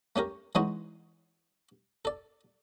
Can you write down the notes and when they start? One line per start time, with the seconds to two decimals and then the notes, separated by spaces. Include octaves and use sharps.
0.16 A3 C#4 G4 A#4
0.55 E3 G#3 C#4 D#4 E4 F#4
2.05 A4 D5